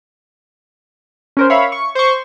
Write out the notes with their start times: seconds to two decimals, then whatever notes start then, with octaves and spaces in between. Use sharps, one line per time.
1.37 C#4 A#4 C5
1.50 C#5 E5 F5 B5
1.72 C#6
1.95 C5 C#6